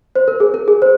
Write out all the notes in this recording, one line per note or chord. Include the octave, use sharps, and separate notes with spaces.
C5
A#4
G#4
A#4
G#4
C5